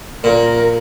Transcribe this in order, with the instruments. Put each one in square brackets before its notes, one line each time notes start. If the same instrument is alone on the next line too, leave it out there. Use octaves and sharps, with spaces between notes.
[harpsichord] A#2 [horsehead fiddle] A#4